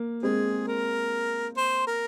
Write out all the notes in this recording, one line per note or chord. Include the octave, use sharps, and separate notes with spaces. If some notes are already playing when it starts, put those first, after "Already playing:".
Already playing: A#3
G#3 C4 G#4
A#4
C5
A#4